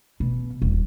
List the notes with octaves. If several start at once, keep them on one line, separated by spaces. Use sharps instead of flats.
B2
D#1